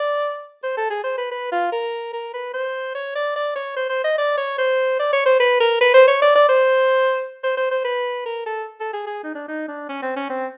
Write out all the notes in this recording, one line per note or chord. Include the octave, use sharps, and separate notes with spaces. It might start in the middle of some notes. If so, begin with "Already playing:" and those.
Already playing: D5
C5
A4
G#4
C5
B4
B4
F4
A#4
A#4
B4
C5
C#5
D5
D5
C#5
C5
C5
D#5
D5
C#5
C5
D5
C#5
C5
B4
A#4
B4
C5
C#5
D5
D5
C5
C5
C5
C5
B4
A#4
A4
A4
G#4
G#4
D#4
D4
D#4
D4
C#4
C4
C#4
C4